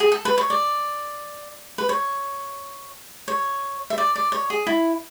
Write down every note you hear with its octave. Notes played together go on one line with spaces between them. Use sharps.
G#4
A4
B4
C#5
D5
B4
C#5
C#5
E5
D5
D5
C#5
G#4
E4